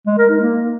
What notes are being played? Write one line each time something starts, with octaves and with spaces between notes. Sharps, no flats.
G#3
A#4
D#4
A#3